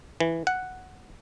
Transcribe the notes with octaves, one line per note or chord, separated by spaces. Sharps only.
E3
F#5